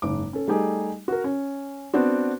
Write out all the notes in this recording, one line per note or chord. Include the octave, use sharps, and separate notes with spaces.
F#1 G#2 D6
C#4 A4
G3 A3 D#4 G4 G#4
F#4 A#4
C#4
B3 C4 D4 F#4